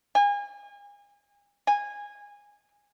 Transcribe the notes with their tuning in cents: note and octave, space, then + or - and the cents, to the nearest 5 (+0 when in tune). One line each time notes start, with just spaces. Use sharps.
G#5 -35
G#5 -15